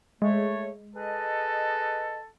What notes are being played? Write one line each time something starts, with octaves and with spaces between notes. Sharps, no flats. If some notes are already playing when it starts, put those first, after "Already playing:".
G#3 A3 C#5
G#4 A4 B4 D#5